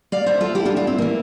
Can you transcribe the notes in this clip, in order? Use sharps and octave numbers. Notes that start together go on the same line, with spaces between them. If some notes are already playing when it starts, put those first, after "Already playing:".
D5 F5
C5 E5
F4 A4
E4 G4
D4 F4
D4 F4
C4 E4
E3 A#3